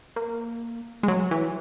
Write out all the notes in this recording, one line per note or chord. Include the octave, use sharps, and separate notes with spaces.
A#3
G#3
F#3
E3